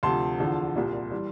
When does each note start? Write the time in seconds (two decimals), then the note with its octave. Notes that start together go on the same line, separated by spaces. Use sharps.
0.03 D2 C3 F3 A5 C6
0.39 E2 D3 F3
0.76 C2 A#2 G3
1.11 E3 G3